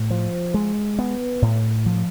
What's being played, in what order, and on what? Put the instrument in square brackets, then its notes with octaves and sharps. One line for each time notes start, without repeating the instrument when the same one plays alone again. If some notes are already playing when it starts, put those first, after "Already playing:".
Already playing: [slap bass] A2
F3
G#3
B3
A2
F3